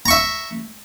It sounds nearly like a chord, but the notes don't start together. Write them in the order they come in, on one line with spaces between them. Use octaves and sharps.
A#5 C#6 E5